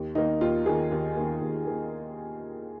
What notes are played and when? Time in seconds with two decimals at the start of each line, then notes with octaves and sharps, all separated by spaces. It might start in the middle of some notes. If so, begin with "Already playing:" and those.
Already playing: D#2
0.15 D#3 A#3 D#4
0.41 D#2 F4
0.66 D#3 A#3 G#4
0.91 D#2
1.17 D#3 A#3
1.41 D#2
1.67 D#3 A#3